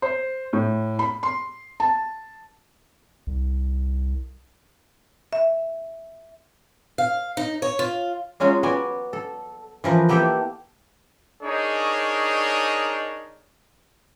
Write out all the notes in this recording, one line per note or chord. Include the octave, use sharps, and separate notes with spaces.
C5
A2
B5
C6
A5
C2
E5
F5
D#4
C#5
F4
F#3 G#3 C#4 F4 F#4
B3 F#4 D5 G#5
A4
E3 F3 A#4 B4
A#3 B3 E4 G4 A4 E5
D4 D#4 G#4 A#4 C#5